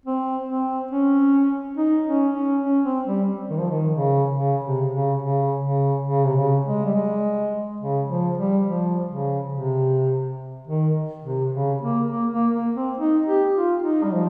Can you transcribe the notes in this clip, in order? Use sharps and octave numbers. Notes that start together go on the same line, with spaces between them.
C4
C4
C#4
D#4
C#4
C#4
C#4
C4
G3
D#3
F3
D#3
C#3
C#3
C3
C#3
C#3
C#3
C#3
C3
C#3
G#3
G3
G#3
C#3
F3
G3
F3
C#3
C3
D#3
C3
C#3
A#3
A#3
A#3
A#3
C4
D#4
G4
F4
D#4
G3
F3